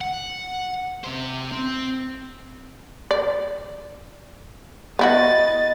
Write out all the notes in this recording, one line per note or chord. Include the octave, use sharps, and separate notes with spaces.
F#5
C3 C5
C4
D5
B3 E4 F#4 D#5 A6